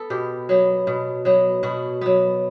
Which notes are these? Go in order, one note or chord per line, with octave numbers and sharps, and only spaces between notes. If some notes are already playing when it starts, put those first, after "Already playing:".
Already playing: B3 A4 B4
B2 G4
F#3 B3
B2
F#3 B3
B2 F#4
F#3 B3